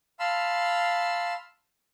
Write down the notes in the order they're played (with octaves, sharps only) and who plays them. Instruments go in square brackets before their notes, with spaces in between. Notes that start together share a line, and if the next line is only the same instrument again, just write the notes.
[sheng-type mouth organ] F5 A5 B5 C6 E6